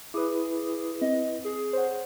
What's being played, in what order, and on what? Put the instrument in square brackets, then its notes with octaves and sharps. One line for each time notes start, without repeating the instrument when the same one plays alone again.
[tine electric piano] E4 B4 [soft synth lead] G#4 [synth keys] D6 D#6
[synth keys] C4 [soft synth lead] D#5
[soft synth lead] G#4
[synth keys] C5 C#5 F#5